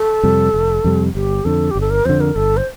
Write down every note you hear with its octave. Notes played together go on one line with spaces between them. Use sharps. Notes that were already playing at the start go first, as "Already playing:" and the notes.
Already playing: A4
F2 C3 G3
F1
F2 C3 G3
G1 G4
F2 D3 A4
G1 G4
A4
A#4
F2 D3 C5
A#4
G1 A4
C5